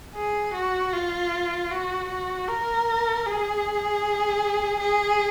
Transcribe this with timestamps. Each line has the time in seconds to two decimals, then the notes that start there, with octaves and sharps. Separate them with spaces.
0.15 G#4
0.54 F#4
0.93 F4
1.71 F#4
2.09 F#4
2.48 A#4
3.26 G#4
4.80 G#4